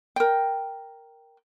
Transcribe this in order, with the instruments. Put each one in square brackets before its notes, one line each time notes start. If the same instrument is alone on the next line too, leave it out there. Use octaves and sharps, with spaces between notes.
[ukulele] A#4 G5